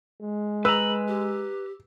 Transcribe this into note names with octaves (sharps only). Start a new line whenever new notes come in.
G#3
B4 A#5 B5 E6
G4